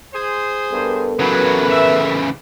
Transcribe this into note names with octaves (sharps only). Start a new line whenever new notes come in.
G#4 C5
G2 B3 A4 A#4
C#3 E3 F#3 B4
E5